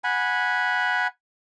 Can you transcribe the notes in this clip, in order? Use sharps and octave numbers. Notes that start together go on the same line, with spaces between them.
F#5 G#5 B5